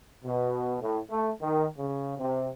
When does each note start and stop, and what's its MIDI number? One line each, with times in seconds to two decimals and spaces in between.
0.24 0.76 47
0.81 0.99 45
1.10 1.31 57
1.41 1.67 51
1.78 2.18 49
2.19 2.48 48